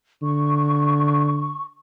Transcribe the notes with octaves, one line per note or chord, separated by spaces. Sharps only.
D3 C#6